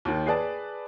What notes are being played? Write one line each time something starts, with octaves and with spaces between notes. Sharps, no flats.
D#2 D#3
G#4 B4 D5 A5